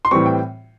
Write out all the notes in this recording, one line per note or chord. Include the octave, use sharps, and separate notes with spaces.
C6
A2 E3 G3 C4 C#6
G5